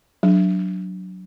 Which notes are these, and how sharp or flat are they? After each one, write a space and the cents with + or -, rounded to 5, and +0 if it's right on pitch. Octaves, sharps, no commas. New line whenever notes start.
F#3 +0 D4 +0